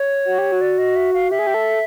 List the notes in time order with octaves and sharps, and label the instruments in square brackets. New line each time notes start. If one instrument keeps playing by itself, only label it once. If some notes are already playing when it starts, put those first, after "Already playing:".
Already playing: [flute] C#5
[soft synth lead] F#4
G4
F#4
[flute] D5
D#5
E5
F5
[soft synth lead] G4 [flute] E5
[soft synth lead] G#4
G4
A4